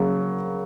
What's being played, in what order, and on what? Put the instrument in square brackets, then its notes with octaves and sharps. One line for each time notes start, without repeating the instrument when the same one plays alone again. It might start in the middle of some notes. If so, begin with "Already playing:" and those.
Already playing: [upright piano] C#3 F#3 A#3